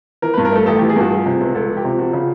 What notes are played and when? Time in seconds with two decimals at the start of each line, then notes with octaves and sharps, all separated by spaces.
0.22 E3 A#4
0.34 G2 B4
0.45 A#4
0.52 A3 A4
0.66 A1 A4
0.78 E3 G4
0.89 G#4
0.96 G2 F#4
1.10 F3 G#4
1.26 C3
1.40 C#2
1.55 C#2 A4
1.69 F3
1.77 G4
1.84 C3
1.99 F3 F#4
2.13 C#3